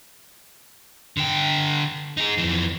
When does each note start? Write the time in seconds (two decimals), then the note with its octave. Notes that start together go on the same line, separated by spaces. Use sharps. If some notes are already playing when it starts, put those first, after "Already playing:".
1.17 D3 G5
2.17 D#4 G#4
2.38 F2 E3